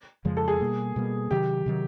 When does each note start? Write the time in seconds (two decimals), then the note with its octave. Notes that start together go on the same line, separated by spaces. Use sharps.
0.25 F2 C#3 F3 G#3
0.37 A4
0.48 G#4
0.60 B2 G3 A#3
0.96 B2 G3 A#3
1.31 C3 D#3 F#3 G4
1.66 C3 D#3 F#3